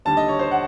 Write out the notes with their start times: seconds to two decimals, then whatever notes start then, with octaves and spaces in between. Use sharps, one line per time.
0.05 D#2 D3 G3 A5
0.17 D#5
0.28 C#5
0.39 C5
0.51 F#5